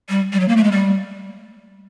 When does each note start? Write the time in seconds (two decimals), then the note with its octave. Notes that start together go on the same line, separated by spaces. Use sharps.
0.09 G3
0.33 G3
0.40 F#3
0.48 A#3
0.57 A3
0.64 G#3
0.72 G3